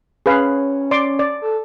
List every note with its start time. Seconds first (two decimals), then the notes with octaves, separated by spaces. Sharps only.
0.26 C#4 G#4 B4 F5
0.91 D5 C6 D6
1.19 D5
1.42 A4